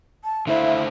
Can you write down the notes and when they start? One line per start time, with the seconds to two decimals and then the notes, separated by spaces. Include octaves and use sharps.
0.24 A5
0.47 D3 A3 E4 C5 E5 F5